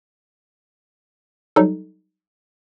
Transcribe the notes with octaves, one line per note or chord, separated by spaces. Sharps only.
F#3 G3 D#4 A4